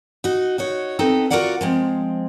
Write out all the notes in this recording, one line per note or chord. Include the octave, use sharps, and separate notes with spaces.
D#4 F#4
D#4 F#4 C#5
B3 C4 D#4 A4
F4 F#4 G#4 A#4 D5 F#5
F3 G#3 C4